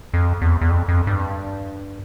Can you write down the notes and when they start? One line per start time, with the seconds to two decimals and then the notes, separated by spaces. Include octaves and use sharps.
0.14 F2
0.42 E2
0.61 E2
0.70 F2
0.88 F2
1.07 G2